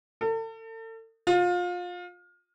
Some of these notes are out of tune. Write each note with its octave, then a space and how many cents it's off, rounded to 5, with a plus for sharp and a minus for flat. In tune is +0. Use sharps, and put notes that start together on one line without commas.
A4 +40
F4 +25